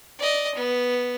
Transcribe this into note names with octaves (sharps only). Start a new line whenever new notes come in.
D5 D#5
B3